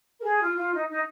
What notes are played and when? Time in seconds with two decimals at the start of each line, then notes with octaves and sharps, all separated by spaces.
0.19 A#4
0.23 G#4
0.41 F4
0.56 F4
0.73 D#4
0.89 D#4